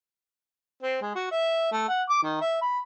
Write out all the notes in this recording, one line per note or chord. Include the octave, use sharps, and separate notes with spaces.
C4
G#3
F#4
E5
A3
F#5
D6
D#3
E5
B5